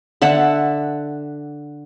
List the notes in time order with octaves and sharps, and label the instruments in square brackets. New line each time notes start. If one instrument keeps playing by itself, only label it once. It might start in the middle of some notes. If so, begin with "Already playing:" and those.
[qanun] D3 E5 F#5 A5